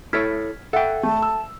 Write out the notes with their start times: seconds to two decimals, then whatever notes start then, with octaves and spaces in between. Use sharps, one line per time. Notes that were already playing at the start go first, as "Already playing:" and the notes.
0.13 E4 A4 C#5 F6 G#6 B6
0.73 A4 E5 F#5 G5
1.03 A3 A5
1.22 E6